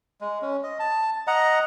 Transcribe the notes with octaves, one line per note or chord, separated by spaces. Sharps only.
G#3
C#4
D#5
A5
D#5 F#5 A#5